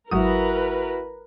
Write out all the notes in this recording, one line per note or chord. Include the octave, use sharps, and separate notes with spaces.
G#1 F#3 E4 F#4 A#4 B4 D#6